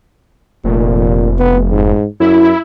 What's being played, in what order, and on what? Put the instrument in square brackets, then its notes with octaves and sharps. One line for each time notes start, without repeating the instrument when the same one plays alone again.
[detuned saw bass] F1 [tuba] A#2
[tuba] B3
G#2
[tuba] F#2 [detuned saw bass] E4